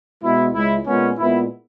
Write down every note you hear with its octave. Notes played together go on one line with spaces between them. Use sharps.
B2 G#3 B3 E4
C#2 C#3 G#3 E4
A#2 G#3 B3 C#4
A#2 G#3 B3 E4